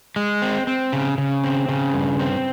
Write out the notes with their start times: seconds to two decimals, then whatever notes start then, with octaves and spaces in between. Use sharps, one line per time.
0.16 G#3
0.42 C4
0.67 C4
0.92 C#3
1.18 C#3
1.44 C4
1.69 C#3
1.94 G2
2.19 C4